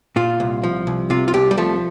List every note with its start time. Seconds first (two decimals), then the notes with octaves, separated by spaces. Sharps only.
0.16 A#2 F4
0.40 C2
0.64 F3
0.87 C2
1.10 C3 F4
1.28 F4
1.34 C2 G4
1.51 G3
1.58 F3 A3